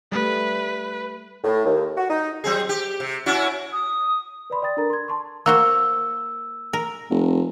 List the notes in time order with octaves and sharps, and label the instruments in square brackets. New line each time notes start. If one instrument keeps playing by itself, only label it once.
[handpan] G3 A3 [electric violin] B4
[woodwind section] A2
D#2
F#4
D#4
[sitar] F#3 C4 G#4
G4
C3
C#4 E4 F#4
[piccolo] D#6
[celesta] B4 D5 B5 C6
D5 G5 D#6 A6
D4 A4 A#4 A#5 A6
C6 G#6
A5 C6 C#6
[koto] A#3 F#4 C5 [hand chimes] E6
[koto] A#4
[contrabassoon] F1